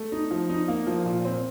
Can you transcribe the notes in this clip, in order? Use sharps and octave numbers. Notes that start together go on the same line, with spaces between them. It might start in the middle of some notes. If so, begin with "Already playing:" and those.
Already playing: A3
D#4
F3
D#4
A#3
F3
A#2
C4